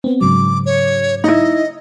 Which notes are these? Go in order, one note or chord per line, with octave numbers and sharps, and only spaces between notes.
B3 C4
G#2 C#3 F#3 D6
C#5
D#4 E4 D#5